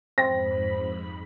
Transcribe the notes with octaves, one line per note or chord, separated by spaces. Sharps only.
F2 G#2 C4 B5 A#6